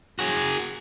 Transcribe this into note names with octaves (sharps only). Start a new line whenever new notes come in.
F#4 G#4